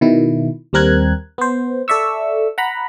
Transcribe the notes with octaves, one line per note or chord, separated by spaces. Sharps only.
B2 D#3 E4
D#2 G3 C4 A#4 F#6 G#6
B3 C5
A4 D5 E5 C#6 E6
F#5 A#5 B5